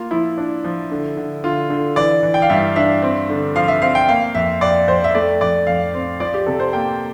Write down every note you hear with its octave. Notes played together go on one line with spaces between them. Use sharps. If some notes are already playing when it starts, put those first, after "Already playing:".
Already playing: A#3 F4
F3 E4
D4
F3
D3
D3
D3 F4
D3
E3 D5
E3
G5
F5
G2 E5
D4 E5
C4
D3
F3 F5
E5
C4 F5
G5
A#3 F5
F2 E5
F2 D5
F2 C5
E5
A3 D5
F2 D5
F2 F5
C4
F3 D5
G4
C3 A4
C5
A#3 G5